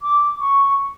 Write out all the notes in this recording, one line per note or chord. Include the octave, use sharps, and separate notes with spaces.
D6
C#6